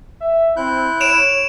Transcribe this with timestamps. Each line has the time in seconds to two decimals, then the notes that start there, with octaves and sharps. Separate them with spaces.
0.21 E5
0.57 C4 E4 F#6 G6
1.01 C#5 D7 E7 F7